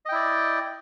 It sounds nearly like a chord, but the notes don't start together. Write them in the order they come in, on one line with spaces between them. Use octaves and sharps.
D#5 G5 E4 D5